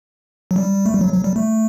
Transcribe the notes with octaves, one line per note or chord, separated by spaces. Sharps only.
F#3
G3
A3
G3
F#3
F#3
G3
A3